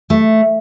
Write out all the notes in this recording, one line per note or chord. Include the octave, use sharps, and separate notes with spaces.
A3